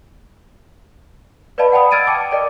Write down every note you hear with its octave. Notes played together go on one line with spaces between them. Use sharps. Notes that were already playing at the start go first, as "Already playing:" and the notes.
B4 D5 D#5 F5 A5 B5
F#5 G5 A5 B5 D#6
E6 F6 G#6 A6 D7 D#7
G5 A5 D6
A#4 D5 D#5 G5